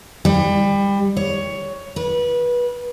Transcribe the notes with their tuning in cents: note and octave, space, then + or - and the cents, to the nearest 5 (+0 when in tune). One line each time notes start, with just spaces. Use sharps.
G3 +25
C#5 +10
B4 -25